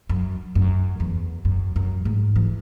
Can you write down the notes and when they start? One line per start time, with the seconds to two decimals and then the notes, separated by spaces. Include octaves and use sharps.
0.09 F#2
0.55 F#2
1.00 E2
1.45 F#2
1.76 F#2
2.05 G#2
2.35 E3